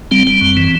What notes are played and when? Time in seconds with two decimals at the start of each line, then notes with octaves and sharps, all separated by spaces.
0.11 G3 C4
0.27 G3
0.41 F#2
0.57 E3